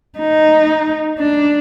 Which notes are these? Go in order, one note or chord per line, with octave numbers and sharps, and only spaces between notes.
D#4
D4